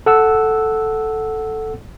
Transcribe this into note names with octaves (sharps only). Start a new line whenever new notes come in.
A4 F#5 E6